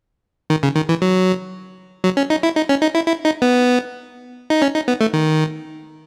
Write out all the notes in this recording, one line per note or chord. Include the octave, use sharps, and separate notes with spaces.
D#3
C#3
D#3
E3
F#3
F#3
C#4
D#4
E4
D#4
C#4
D#4
E4
E4
D#4
B3
D#4
C#4
D#4
B3
A3
D#3